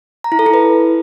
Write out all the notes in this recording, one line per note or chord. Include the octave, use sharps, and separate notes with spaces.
A#5
E4
A4
E4
B4